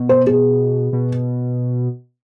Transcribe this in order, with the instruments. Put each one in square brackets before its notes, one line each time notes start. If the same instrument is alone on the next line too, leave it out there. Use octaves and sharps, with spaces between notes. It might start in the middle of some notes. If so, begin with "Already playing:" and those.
Already playing: [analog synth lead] B2
[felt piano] C5
G#4
[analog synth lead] B2